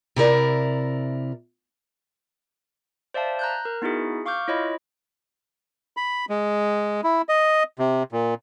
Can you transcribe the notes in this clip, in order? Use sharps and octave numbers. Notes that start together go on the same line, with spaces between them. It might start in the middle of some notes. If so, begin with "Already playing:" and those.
C3 E4 A#4 D5
C5 D5 E5 F5 A5
A#5 F#6 G6
A#4
B3 D#4 E4 F#4 G#4
F5 C#6 D6 F6 G6
E4 F4 C#5 D#5 B5
B5
G#3
E4
D#5
C3
A#2